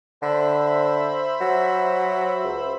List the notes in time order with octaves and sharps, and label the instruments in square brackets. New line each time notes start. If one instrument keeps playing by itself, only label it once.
[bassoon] D3 [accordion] C5 E5 B5
[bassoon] F#3
C#2